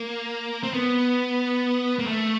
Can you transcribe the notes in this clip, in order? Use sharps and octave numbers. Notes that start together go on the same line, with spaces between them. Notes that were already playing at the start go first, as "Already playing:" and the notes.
Already playing: A#3
C4
B3
A#3
A3